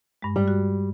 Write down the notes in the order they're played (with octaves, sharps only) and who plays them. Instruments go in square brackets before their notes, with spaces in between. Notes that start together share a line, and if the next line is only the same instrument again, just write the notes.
[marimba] G2 G#3
[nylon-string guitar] G3
[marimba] F#4